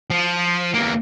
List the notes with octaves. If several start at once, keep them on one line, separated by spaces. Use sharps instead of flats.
F3
E2 A#3